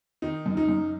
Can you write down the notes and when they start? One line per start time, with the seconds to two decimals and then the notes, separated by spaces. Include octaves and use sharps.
0.22 D#3 D#4
0.46 F#2
0.57 D#4
0.69 F#2